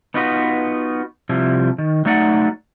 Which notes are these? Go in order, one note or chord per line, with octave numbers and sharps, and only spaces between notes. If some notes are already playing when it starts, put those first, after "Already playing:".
B3 D#4 F4 F#4 B4
C3 F3 G3 E4
D#3
F#3 A3 D#4 D5 F#5